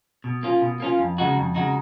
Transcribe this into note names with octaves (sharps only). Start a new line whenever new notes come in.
B2
A#3 C#4 F4
B2
A#3 C#4 F4
F2
C#3 G#3 D#4 F#4
F2
C#3 G#3 D#4 F#4